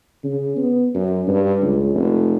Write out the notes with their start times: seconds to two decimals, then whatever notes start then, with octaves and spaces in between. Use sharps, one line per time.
0.24 C#3
0.57 B3
0.95 F#2
1.28 G2
1.62 C#2
1.95 F1